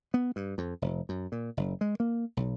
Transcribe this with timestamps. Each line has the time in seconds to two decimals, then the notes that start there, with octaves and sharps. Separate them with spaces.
0.14 B3
0.36 G2
0.58 F2
0.82 F1
1.09 F#2
1.32 A#2
1.57 F#1
1.81 G#3
2.00 A#3
2.37 B1